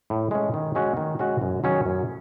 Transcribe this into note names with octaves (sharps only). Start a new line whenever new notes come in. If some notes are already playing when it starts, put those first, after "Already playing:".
A2
G#3 C#4
D#3
G#3 C#4 F#4
D#3
G#3 C#4 F#4
F#2
D#3 F#3 C#4 G#4
F#2